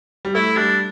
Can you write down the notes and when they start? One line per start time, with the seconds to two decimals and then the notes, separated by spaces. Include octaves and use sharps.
0.25 G3
0.35 A3 E4
0.56 G3 D4